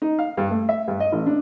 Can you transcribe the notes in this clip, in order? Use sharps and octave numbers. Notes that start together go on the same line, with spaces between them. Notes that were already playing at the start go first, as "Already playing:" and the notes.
D#4
F5
G2
A3
E5
G2
D#5
A1
D4